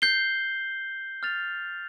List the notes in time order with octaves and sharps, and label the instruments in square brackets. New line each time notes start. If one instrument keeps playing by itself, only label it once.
[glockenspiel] G6 C7 G7
F6 A6 F7